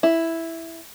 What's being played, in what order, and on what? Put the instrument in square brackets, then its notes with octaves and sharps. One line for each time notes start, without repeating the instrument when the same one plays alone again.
[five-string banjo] E4